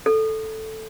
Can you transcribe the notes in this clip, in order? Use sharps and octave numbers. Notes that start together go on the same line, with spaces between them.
A4